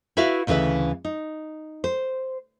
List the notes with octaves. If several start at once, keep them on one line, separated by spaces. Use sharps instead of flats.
E4 F#4 B4 E5 F5
D2 C#3 E3 D4 B4 E5
D#4
C5